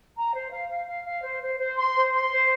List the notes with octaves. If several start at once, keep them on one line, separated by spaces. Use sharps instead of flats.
A#5
C5
F5
F5
F5
F5
C5
C5
C5
C6
C5
C6
C5